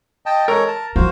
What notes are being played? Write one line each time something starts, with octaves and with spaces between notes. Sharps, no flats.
D#5 G5 A5
G#3 A4 A#4 C#5
A5
F3 F#4 C5 F5